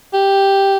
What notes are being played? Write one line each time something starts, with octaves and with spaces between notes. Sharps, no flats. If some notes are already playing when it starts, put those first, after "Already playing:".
G4